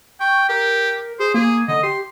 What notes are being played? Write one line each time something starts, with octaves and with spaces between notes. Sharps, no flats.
G5 C#6
G4 A#4
G#4 C5
A#3 G#4
D3 D#5
G4 C6